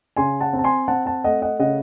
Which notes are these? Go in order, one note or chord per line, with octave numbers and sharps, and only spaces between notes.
C#3 G#5 C6
F#5 A5
C4
A5
G#5 C6
C4 F#5 A5
F#5 A5
A3 D#5 F#5
D#5 F#5
C#3 D#5 F#5